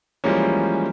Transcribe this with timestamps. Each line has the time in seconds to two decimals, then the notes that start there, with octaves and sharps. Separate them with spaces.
0.24 E3 F3 G3 G#3 A#3 C#4